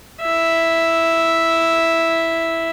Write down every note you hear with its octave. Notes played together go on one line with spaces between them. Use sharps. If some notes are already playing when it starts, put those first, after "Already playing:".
E4 E5